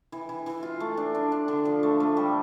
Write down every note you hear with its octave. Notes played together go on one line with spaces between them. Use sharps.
E3
E3
E3
F4
A3
D4
D4
D4
D3
F3
A3
A3
G3